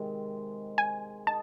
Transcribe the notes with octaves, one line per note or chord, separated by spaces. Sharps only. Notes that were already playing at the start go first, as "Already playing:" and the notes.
Already playing: C3 D#3 G#3
G#5
D#4 A5